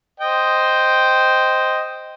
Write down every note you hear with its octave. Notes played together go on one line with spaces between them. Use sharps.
C5 D#5 G5